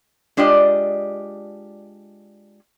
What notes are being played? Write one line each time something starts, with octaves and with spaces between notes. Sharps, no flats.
G#3 D4 F4 G4 D5 D#5